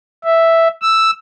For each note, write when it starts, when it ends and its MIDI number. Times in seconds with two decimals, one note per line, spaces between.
0.24 0.68 76
0.82 1.11 88